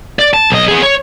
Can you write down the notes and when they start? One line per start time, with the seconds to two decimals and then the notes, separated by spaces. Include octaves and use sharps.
0.19 D5
0.34 A5
0.50 B1 D#5
0.68 B3 G#4
0.82 C#5